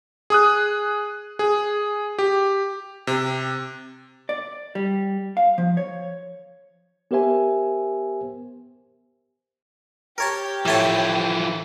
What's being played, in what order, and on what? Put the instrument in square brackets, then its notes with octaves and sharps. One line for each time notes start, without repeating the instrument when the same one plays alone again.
[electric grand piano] G#4 D#6 F#6
G#4
G4
C3
[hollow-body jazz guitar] D5
G3
F5
F3
C#5
[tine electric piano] B3 G4 A#4 C5 E5 G#5
[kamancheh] G4 [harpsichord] A#4 C#5 A5
[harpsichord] A2 C#5 A5 [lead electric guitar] E3 F3